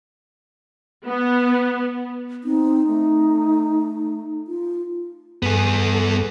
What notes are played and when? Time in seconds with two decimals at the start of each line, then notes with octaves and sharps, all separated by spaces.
1.06 B3
2.44 C4 D#4
2.88 A3
4.47 F4
5.43 G2 B3 G#4 A4